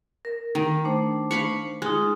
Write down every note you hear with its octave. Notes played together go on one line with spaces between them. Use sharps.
A#4
D#3
A3 D4 C5
F5 B5 C#6
G#3 D#4 F4